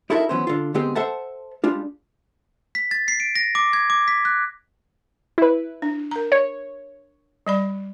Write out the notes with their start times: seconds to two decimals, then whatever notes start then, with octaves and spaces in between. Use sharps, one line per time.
0.10 D#4 E4 F#4 A4 A#4 E5
0.29 E3 F#3 B3 C#4 C5
0.47 D3 F4
0.74 D3 G#3 B3 C4 G4 G#4
0.95 A4 C5 E5 F#5 A5
1.64 G3 G#3 D4 F4
2.75 B6
2.91 A6
3.08 C7
3.20 D7
3.36 A#6
3.55 D6
3.73 G#6
3.90 D6
4.08 B6
4.25 F#6
5.38 E4 B4
5.82 D4
6.11 A#4 A#5
6.32 C#5
7.47 G3 D5 B5